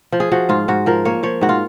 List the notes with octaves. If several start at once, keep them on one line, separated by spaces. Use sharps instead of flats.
F3
G#4
F3 F#4
G#2 F4
G#2 F#4
F3 A#4
A#3 C#5
F3 C#5
G#2 F#4
F4